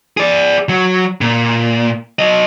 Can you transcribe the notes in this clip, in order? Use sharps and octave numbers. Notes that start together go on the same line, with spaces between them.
G#4 D5
F#3
A#2
F#3 D#5